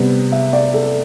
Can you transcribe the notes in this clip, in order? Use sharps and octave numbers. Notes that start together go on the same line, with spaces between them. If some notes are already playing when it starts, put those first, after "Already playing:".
Already playing: C3 G3 B3
E5
D5
A4